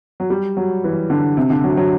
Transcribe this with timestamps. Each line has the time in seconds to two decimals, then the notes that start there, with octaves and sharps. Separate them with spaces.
0.20 F#3
0.30 G3
0.57 F#3
0.84 E3
1.10 D3
1.37 C3
1.50 D3
1.64 F#3
1.77 F#3